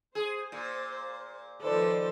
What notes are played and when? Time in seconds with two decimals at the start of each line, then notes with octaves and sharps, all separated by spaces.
0.15 G#4 C5
0.52 A#2
1.62 D#3 F3 A4 B4 C5 D5